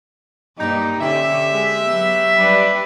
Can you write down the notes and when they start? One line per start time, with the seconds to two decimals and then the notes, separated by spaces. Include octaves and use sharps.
0.58 G2 A#3 D#4 G4
1.00 D3 C#4 G4 E5
1.51 G#3
1.83 F#3 B3
2.37 G3 D4 B4